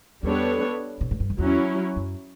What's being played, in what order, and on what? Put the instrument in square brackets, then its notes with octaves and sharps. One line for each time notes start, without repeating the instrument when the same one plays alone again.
[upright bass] E2 [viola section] G3 B3 D4 A4 C#5
[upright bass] B2
A2
G2
F#2
[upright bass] E2 [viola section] F#3 C#4 E4
[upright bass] F#2